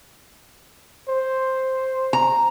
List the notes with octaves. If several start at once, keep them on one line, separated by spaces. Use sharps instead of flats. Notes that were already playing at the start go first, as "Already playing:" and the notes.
C5
A#5